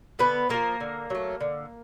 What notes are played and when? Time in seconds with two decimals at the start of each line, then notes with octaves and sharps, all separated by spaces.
0.19 D3 B3 B4
0.49 F3 G#3 A#3 A#4
0.81 D3
1.10 F#3 A3
1.41 D3